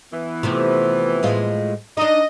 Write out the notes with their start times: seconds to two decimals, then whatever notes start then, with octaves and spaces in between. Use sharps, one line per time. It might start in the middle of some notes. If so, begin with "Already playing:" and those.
0.12 E3 B3
0.43 C3 F3 A3
1.23 A2 G#3 F4
1.97 D4 D#4 D#5